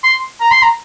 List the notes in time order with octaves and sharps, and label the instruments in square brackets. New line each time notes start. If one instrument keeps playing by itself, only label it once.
[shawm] C6
A#5
C6
A#5